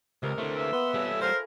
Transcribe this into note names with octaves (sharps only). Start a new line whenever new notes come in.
C#2 C3 A#4 D#5
D3 E3 A3 C5 C#5
A#3 G#4 E5
B3 B5 C6
G3 F4 G#4 A4 C#5
A#4 C5 F5 G#5 B5